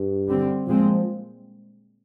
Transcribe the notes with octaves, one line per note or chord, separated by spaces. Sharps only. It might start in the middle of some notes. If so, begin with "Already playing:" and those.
Already playing: G2
D3 G3 C4
A#2 F3 G#3 C4